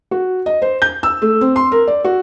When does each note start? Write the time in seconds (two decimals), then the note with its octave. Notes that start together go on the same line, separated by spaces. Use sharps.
0.11 F#4
0.46 D#5
0.62 C5
0.82 G6
1.03 E6
1.22 A3
1.41 C4
1.56 C6
1.72 A#4
1.87 D5
2.05 F#4